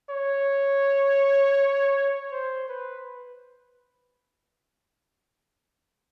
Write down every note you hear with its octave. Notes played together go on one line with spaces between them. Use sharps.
C#5
C5
B4